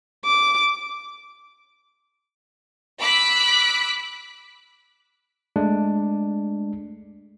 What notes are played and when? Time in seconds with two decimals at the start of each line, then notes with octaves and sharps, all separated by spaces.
0.25 D6
3.00 B5 D6 E6 F#6 B6
5.56 G#3 A3 D4